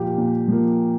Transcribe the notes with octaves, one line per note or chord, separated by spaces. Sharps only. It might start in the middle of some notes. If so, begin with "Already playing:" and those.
Already playing: A#2 F3 A#3 G4 A#4
A#2
F3 A#3